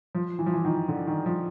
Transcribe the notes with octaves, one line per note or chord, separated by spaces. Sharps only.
F3
E3
F3
E3
D#3
D3
D#3
F3